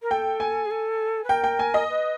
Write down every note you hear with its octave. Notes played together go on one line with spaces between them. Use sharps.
A#4
A4 G5
G#5
G#4
A4
B4
A#4 G5
G5
G#5
D#5
B4